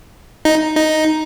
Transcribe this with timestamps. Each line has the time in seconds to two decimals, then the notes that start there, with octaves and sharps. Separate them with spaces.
0.45 D#4
0.76 D#4